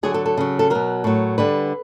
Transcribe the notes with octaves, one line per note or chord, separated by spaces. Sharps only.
D3 F#3 G#4
A4
A4
C#3 F#3
A4
B2 F#3 A#4
A2 F#3
D3 G3 B4